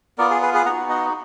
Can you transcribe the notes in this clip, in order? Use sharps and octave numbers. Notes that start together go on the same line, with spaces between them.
B3 F4 A#4 D5
G#4
G#4 B4
G#4 B4
B3 D#4 F#4 F#5 A#5
D#5 F#5